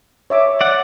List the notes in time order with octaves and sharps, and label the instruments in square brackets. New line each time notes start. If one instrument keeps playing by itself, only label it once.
[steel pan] C#5 E5 D6
[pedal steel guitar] D5 F#5